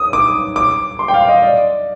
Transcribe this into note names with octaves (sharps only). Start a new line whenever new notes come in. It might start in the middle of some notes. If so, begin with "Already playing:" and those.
Already playing: D#6
D6
D6
C6
G5
F5
D#5
D5